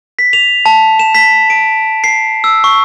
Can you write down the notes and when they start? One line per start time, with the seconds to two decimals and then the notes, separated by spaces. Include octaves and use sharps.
0.19 B6
0.33 F7
0.66 A5
0.99 E7
1.15 B6
1.50 D7
2.04 C7
2.44 E6
2.64 C#6